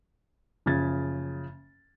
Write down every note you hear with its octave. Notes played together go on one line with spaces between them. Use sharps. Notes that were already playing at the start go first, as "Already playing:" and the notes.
F#1 C#3 F3 G#6 A6